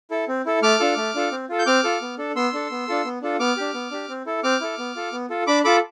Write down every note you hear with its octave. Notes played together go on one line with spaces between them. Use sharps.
E4 A4
C4
E4 A4
A3 D6 F6
D4 F4 A4
A3
D4 F4 A4
C4
F4 A4
G6
C4 D6 F6
F4 A4
B3
D4 A4
B3 C6 E6
D4 A4
B3
D4 F4 A4
B3
D4 F4 A4
B3 D6 F6
D4 G4
B3
D4 G4
C4
E4 A4
C4 D6 F6
E4 A4
B3
F4 A4
B3
F4 A4
D4 B5 D6
F4 A4 B5 D6